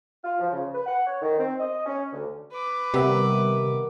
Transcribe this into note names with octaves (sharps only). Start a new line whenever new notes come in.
F4
F3
C#3
B4
F#5
C#5
D#3
C4
D#5
C#4
D2
B4 D6
C3 D#3 G3 B3 E5 F#5